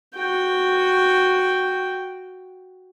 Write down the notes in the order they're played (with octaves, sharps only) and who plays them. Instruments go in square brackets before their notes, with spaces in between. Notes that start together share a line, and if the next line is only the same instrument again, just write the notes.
[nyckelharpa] F#4 G5